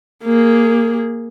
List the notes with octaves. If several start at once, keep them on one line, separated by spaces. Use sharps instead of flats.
A#3 G#4